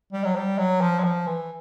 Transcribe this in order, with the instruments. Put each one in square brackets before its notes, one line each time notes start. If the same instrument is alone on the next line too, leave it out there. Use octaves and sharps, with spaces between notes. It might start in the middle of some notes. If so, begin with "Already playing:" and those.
[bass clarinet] G3
F#3
G3
F#3
F3
F#3
F3
E3